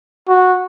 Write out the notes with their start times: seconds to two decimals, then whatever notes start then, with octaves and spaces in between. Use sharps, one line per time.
0.28 F#4